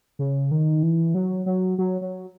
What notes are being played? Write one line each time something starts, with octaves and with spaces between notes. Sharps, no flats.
C#3
D#3
E3
F#3
F#3
F#3
F#3